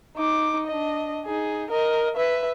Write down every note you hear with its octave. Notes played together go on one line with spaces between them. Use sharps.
D#4 D6
D4 D#5
D#4 G#4
A#4 D#5
B4 E5